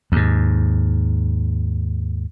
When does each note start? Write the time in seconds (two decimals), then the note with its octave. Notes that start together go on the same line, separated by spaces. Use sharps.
0.12 D#2 G#2